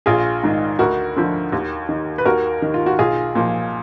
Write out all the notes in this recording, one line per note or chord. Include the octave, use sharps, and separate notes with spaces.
A#1 F4 G#4
G#2 D#3
D2 F#4 A#4
D3 F3
D#2
D#3
B4
D#2 F#4 A#4
D#3
F4
F#4
B1 F4 G#4
A#2 F3